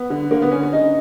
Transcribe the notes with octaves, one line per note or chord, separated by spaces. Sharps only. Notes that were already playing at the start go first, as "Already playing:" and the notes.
Already playing: B3
D3
D3 A#3
B3
D3 C#4
C#4
D3 D#4